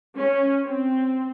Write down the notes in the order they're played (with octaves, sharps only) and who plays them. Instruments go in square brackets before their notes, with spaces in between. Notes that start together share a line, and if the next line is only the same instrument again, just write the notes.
[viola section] C#4
C4